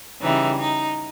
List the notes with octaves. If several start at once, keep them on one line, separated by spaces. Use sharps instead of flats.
C#3 E3 G3 D#4
D#4